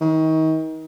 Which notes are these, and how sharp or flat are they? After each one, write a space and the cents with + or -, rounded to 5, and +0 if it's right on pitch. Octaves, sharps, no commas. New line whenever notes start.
D#3 +35